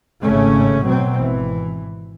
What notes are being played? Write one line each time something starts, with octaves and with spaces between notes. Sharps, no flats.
G#1 A2 C#3 A3 C#4
B2 F#3 C4
G#1 E3